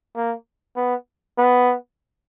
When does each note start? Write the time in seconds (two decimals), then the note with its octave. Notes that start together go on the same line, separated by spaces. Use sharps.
0.16 A#3
0.76 B3
1.38 B3